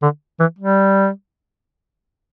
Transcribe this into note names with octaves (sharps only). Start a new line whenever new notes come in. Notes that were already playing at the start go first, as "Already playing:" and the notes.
D3
E3
G3